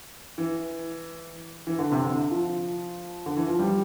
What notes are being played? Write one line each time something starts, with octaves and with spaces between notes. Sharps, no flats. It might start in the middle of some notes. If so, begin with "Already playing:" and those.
E3
E3
D3
C3
D3
F3
D3
E3
F3
G3